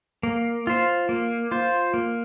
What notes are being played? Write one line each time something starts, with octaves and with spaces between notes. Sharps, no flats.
A#3
F4 C5
A#3
F4 C5
A#3